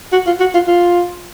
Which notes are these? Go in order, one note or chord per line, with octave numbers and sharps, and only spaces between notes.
F#4
F4
F#4
F4
F4